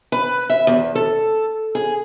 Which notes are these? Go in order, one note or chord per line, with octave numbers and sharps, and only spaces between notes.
B4
E5
E2
A4
G#4